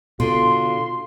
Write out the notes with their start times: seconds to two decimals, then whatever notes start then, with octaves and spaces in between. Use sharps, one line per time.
0.20 B2 D3 F4 C6